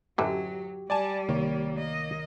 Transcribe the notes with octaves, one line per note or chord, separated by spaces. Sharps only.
A1 F#2 D3 F#3 G4
G3 D5 G#5 A5
C2 D#3 A#3 C#5
D#5